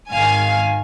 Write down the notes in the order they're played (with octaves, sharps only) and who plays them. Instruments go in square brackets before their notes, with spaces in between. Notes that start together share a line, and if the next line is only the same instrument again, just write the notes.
[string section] G#1 G#2 D#3 F5 G#5